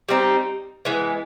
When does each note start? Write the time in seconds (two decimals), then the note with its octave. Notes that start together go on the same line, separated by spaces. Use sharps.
0.09 G3 C4 D#4
0.85 E3 G#3 B3